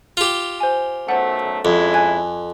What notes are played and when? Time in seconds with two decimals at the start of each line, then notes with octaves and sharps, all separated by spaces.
0.17 F4 G4
0.60 C5 G#5
1.09 B1 F#2 A3 C5 F#5
1.65 F2 G#3 C#4 E4
1.94 G#5 F#6 G#6